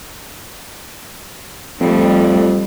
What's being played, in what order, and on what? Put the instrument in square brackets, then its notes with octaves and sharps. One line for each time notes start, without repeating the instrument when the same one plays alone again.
[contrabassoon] F2 [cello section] F3 G3 A3